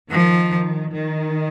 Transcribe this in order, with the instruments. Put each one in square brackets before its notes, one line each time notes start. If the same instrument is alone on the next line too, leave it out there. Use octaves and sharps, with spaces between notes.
[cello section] D#3 [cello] F3
[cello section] D#3